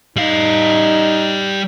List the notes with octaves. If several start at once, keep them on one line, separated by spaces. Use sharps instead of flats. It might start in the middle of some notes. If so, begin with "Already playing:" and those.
G3 D#4 F5